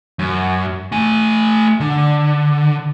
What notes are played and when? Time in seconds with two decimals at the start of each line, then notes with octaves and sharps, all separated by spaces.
0.19 F#2
0.92 A3 G#5
1.80 D3